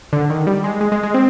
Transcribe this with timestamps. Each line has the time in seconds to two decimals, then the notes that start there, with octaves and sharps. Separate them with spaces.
0.13 D3
0.30 D#3
0.47 G3
0.64 G#3
0.81 G#3
0.92 G#3
1.03 G#3
1.14 C4